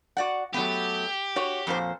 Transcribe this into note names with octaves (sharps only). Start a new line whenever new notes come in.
F#4 D5 F#5
F#3 A3 B3 G4
F#4 C#5
F2 A#2 C5